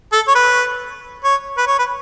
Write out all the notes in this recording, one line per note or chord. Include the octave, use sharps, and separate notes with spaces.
A4
C#5
B4
C#5
B4
C#5
B4